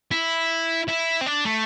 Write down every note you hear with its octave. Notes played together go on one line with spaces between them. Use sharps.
E4
E4
C4
D4
A3